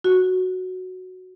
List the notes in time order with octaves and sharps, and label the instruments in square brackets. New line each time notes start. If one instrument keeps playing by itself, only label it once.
[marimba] F#4